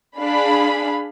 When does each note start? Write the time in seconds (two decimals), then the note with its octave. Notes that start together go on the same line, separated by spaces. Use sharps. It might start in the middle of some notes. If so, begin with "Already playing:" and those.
0.18 D4 G#4 F5 B5